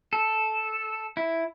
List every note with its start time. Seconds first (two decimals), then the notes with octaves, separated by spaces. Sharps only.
0.13 A4
1.17 E4